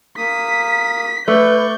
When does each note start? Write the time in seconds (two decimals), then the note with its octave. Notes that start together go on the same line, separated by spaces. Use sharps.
0.17 A#3 D#6 B6
1.28 A3 B4 D5 C#6 G6